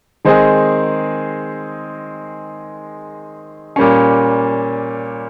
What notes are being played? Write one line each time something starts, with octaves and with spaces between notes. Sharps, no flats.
D#3 G#3 C4 D#4 G#4
A#2 G3 A#3 C#4